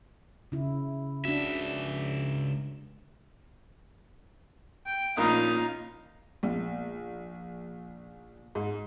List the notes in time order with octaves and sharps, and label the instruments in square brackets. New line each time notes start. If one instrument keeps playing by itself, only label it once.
[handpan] C#3 E4
[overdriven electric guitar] C#2 E5 [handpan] D4 F#4
[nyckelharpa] G5
[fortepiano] A#1 D#6 [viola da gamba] A#3 C#4 F4 [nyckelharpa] D#4 F5
[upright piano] A#1
G#2